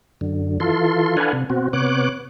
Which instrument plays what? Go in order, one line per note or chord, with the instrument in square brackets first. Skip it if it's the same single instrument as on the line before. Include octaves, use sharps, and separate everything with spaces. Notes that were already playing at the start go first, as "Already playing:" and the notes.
[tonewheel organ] F#2 D3
E3 F4 A4 C6
D4 A4 B4 F5 F#5 G#5
C3
B2 C4 F#4
C3 B3 C#5 D6 F#6